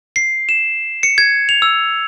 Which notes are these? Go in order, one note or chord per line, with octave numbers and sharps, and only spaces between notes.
C7
E7
C#7
G#6
F7
E6